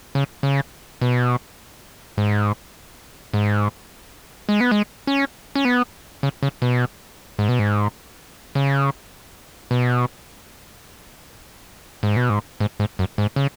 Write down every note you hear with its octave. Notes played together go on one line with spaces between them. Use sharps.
C#3
C#3
B2
G#2
G#2
G#3
B3
G#3
C#4
C#4
B3
C#3
C#3
B2
G#2
B2
G#2
C#3
B2
G#2
B2
G#2
G#2
G#2
F#2
G#2
C#3